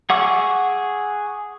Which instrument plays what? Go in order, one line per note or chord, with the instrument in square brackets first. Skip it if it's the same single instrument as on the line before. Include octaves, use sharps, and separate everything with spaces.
[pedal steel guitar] G#4 F#5 C#6 D6 E6